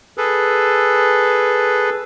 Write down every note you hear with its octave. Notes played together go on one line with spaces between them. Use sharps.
G#4 A4 B4